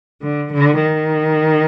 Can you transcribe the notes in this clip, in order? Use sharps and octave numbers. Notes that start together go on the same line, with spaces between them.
D3
D3
D#3